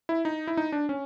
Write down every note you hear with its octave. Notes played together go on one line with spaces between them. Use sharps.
E4
D#4
E4
D#4
D4
C#4